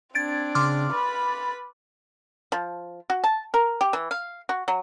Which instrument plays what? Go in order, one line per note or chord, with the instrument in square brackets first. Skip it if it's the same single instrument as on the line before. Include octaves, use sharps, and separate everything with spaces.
[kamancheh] C4 D4 [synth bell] G#6 A6 D7
[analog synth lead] C#3 [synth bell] C6 D6 F6
[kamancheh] B4 B5 [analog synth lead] A6
[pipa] F3
F#4
A5
A#4
G4
E3
F5
F#4
F#3